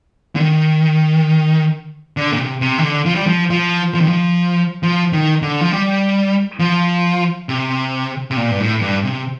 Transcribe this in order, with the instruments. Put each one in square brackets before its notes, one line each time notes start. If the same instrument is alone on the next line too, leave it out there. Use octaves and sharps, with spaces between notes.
[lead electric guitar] D3
D#3
D3
A#2
C3
C3
D#3
D3
F3
G3
F3
F3
F3
D#3
F3
F3
D#3
D3
F3
G3
F3
C3
C3
A#2
G2
A2
G2
C3